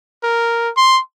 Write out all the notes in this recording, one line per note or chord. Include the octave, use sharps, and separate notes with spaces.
A#4
C6